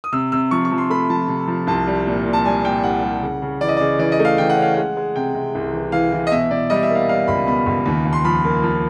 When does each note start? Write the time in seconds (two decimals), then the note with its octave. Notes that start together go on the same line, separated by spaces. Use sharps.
0.04 D#6
0.12 C3 E6
0.32 C3 E6
0.51 F3 C#6
0.65 C#6
0.72 F3
0.78 C6
0.90 A3 B5
1.09 F3 A5
1.28 C3
1.48 F3
1.67 C2 A5
1.87 G3
2.07 A#2
2.26 A#2
2.33 A5
2.45 G3 G#5
2.64 A#2 G5
2.83 C2 F#5
3.03 G3
3.22 C#3
3.42 C#3
3.61 E3 D5
3.68 D#5
3.77 C#3 D5
3.99 E3 D5
4.12 D#5
4.19 A3
4.25 F5
4.38 E3 G5
4.50 F#5
4.57 C#4
4.62 F5
4.74 G#3 F#5
4.97 G#3
5.16 C3 G5
5.35 C3
5.55 C2
5.73 E3
5.92 E3 F5
6.12 E3
6.27 D#5
6.31 B2 E5
6.51 B2 D5
6.70 G3 D#5
6.83 E5
6.89 A#3
6.95 F5
7.09 G3 F5
7.28 C#2 B5
7.47 B2 B5
7.66 C#2
7.86 D#2
8.05 D#2
8.13 C6
8.25 F3 B5
8.44 A#3
8.63 F3